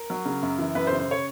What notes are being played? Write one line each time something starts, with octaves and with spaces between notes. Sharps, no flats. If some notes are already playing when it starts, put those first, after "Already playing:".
Already playing: A#4
F#3
C#3
F#2
E3
F#2 B4
C5
C#3
C5
C#5